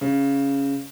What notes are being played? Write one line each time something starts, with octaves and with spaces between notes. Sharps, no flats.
C#3